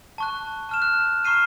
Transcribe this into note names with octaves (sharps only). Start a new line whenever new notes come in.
A5 C#6 F#6
A5 F6 E7
F#6
A#5 C#6 F6 C7 D#7